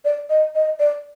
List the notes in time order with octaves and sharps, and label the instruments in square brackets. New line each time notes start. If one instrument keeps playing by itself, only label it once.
[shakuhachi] D5
D#5
D#5
D5